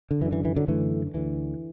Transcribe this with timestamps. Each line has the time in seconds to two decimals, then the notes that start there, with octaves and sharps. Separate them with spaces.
0.11 D3
0.21 F#2 E3
0.25 D3
0.32 E3
0.45 E3
0.56 D3 F#3
0.68 F#2 D3 E3 A3
1.14 D2 D3 E3